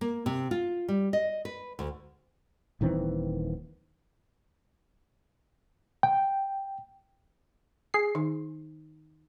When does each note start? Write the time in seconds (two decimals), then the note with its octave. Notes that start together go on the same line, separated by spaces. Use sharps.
0.01 A#3
0.26 C3
0.51 F4
0.88 G3
1.13 D#5
1.45 B4
1.79 D2
2.81 D#1 D#3 E3 C4
6.03 G5
7.94 G#4 C7
8.15 D#3 D#4